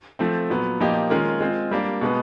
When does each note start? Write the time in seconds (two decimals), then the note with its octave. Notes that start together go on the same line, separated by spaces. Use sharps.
0.19 F3 A3 C4
0.50 A#2 F#3 B3
0.80 A#2 F3 A#3 D#4 G4
1.10 D#3 G#3 C#4 F4 A#4
1.41 G#3 C4 F4
1.71 G3 A#3 D4
2.01 B2 G#3 B3